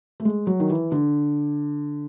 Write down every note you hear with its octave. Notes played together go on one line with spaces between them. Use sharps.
A3
G#3
F#3
D#3
E3
D3